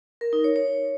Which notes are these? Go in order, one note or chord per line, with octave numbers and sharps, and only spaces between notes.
A#4
D#4
C#5
C#5